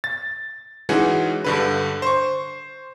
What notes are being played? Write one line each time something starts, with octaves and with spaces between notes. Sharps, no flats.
A6
E3 G#3 C#4 D#4 F#4 G#4
G2 D3 B4
C5 C#6